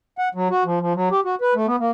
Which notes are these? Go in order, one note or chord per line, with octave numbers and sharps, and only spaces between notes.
F#5
F#3
F#4
F3
F3
F#3
G4
F#4
B4
A3
B3
A#3